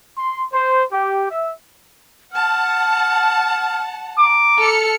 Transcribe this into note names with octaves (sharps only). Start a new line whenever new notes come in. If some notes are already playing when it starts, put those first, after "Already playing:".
C6
C5
G4
E5
F#5 A5 F6
A#5 D6
A4 F6 C#7